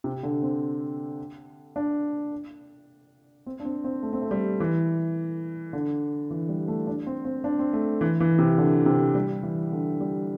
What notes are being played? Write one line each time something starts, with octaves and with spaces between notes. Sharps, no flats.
C3
D3
C4
D4
C4
D4
C4
C4
A3
C4
A3
G3
E3
D3
E3
G3
A3
D4
C4
C4
D4
C4
A3
E3
E3
C3
D3
C3
G3
E3
D3
G3